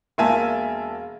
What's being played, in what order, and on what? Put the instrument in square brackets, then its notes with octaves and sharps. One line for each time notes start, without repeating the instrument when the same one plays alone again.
[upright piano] E1 A#3 E5 G#5 A5